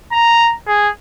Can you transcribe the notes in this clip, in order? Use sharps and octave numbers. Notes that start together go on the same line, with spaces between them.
A#5
G#4